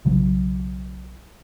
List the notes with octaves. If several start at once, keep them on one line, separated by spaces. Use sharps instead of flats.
B1 C#3 F#3